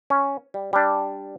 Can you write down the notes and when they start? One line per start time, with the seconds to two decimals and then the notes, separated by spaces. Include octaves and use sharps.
0.10 C#4
0.54 G3
0.73 G3 D4